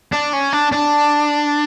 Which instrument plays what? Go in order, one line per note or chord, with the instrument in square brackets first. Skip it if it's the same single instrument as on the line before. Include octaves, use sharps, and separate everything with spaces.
[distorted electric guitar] D4
C#4
D4
D4